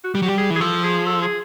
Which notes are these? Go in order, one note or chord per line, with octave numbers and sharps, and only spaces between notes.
F#4
G3 G4
F#3
G3 G4
G#4
E3
G#4
F3 A4
G#4
A4
G#4